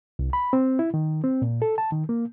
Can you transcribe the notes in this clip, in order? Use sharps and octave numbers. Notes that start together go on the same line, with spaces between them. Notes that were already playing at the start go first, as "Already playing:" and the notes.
C2
B5
C4
E4
D#3
C4
A#2
A4
A5
D#3
A#3